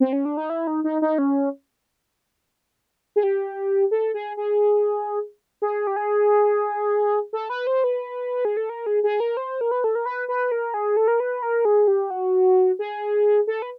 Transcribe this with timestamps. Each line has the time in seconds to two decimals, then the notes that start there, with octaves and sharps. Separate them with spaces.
0.00 C4
0.13 C#4
0.25 D4
0.37 D#4
0.50 E4
0.67 D#4
0.84 D#4
1.02 D#4
1.18 C#4
3.16 G#4
3.23 G4
3.91 A4
4.14 G#4
4.37 G#4
5.62 G#4
5.87 G4
5.96 G#4
7.33 A4
7.50 B4
7.67 C5
7.84 B4
8.45 G#4
8.57 A4
8.69 A#4
8.86 G#4
9.04 G#4
9.20 A#4
9.37 C5
9.61 A#4
9.71 B4
9.84 A4
9.95 A#4
10.06 B4
10.29 B4
10.52 A#4
10.74 G#4
10.97 A4
11.08 A#4
11.20 B4
11.43 A#4
11.65 G#4
11.88 G4
12.10 F#4
12.79 G#4
13.47 A4
13.62 B4